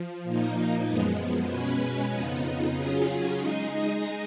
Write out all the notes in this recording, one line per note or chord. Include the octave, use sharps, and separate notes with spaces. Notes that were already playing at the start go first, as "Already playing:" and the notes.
Already playing: F3
A#2 F3 A#3 D#4
F#2 F3 G#3 B3
B2 G#3 C#4 G#4 B4
F2 C#3 F3 B3 D#4
C#3 F#3 C#4 F4 G#4
G#3 D#4 G#4 D#5